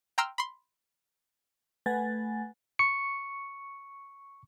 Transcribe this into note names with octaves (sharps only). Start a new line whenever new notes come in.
G5 A#5 C6 E6 F6
B5 C6
A3 B4 F#5 G#5 A6
C#6 C#7